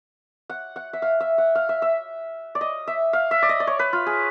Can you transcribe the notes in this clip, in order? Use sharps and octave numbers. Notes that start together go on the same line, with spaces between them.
F#5
F#5
E5
F5
E5
F#5
F5
E5
E5
D5
D#5
E5
F5
E5
D5
D#5
D5
C#5
B4
F4
G#4